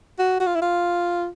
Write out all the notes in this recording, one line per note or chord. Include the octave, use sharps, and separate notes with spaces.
F#4
F#4
F4
E4
F4